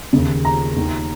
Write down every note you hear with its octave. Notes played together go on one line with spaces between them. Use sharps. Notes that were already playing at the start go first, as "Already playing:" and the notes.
D#2 C#3
A#5
D#2 D#3